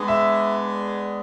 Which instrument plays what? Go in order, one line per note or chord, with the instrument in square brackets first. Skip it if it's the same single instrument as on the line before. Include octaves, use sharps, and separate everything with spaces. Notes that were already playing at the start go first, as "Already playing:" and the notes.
Already playing: [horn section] G#3 B3 D4
[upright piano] E5